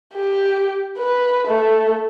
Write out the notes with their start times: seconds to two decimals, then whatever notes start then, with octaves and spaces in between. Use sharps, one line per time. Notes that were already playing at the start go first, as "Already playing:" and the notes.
0.14 G4
0.98 B4
1.47 A3